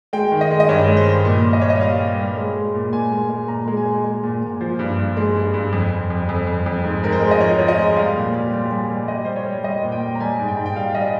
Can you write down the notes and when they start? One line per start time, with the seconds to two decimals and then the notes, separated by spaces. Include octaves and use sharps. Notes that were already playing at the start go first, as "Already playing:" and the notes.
0.13 G#3 G5
0.32 D#3
0.41 D#5
0.51 G#3
0.60 D#5
0.69 G2 C#5
0.88 G#3
0.97 C5
1.06 G2
1.25 A#2
1.44 A#2
1.53 D#5
1.61 G3 C#5
1.70 D#5
1.81 G3 F5
1.99 G3
2.18 G3
2.37 G#3
2.55 G#3
2.74 A#2
2.93 A#2 G#5
3.11 G#3
3.30 G#3
3.48 A#2 A#5
3.68 G#3
3.77 G#5
3.86 G#3
4.04 G#3
4.23 A#2
4.43 A#2
4.61 F3 C5
4.79 G2
4.98 G2
5.17 G#3
5.36 G2
5.54 G2
5.73 F2
5.91 F2
6.10 F2
6.29 F2
6.47 F2
6.66 F2
6.84 G#2
7.03 G#2 A#4
7.12 C5
7.21 G#3
7.31 D#5
7.40 F3 C#5
7.59 F3 C#5
7.68 D#5
7.78 G#3
7.96 G3 F5
8.15 A#2
8.34 G3
8.53 G3
8.71 G3
8.90 G3
9.08 G3 D#5
9.25 G3 C5
9.36 C#5
9.45 G3
9.64 G3 D#5
9.83 A#2
9.92 G5
10.01 G3
10.15 A#5
10.20 G3 G#5
10.39 G#2
10.48 G5
10.57 G#2
10.66 G5
10.76 G3 F5
10.94 G3 D#5